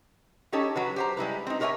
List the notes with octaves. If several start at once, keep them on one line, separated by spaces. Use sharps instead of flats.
C#4 D#4 G4 A4 C#5
F#3 F#4 B4
G4 C5 A#5
G3 G#3 E4 B4
C4 D#4
G4 A#4 C#5 D5 E5 G#5